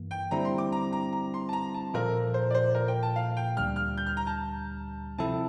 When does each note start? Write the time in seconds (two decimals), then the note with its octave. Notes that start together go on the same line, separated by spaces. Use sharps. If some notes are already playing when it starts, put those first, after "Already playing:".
Already playing: G2 E3 A#3
0.11 G5
0.31 D3 G3 C4 E4 A#5
0.45 C6
0.58 D6
0.72 A#5
0.93 A#5
1.13 A#5
1.34 C6
1.49 A5
1.53 A#5
1.74 A5
1.94 A#2 F3 A#3 F4 A4 A#4
2.34 C5
2.51 D5
2.55 C5
2.75 A#4
2.88 G5
3.03 A5
3.16 F5
3.37 G5
3.57 D2 D3 G3 F6
3.76 F6
3.98 G6
4.06 F6
4.17 A#5
4.27 A5
5.18 C3 F3 C4 E4 A4 A5